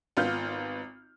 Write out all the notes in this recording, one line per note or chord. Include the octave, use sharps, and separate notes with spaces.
G#1 B3 F4 F6 G6